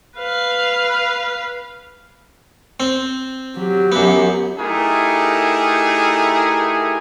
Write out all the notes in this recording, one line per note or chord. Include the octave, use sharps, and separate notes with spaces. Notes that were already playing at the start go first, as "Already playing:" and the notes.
B4 F5
C4
F#3 G4
F#2 B3
A3 D#4 E4 G4 G#4 A#4